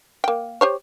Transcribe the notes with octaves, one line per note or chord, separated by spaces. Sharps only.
A#3 G5
G4 C5 C#5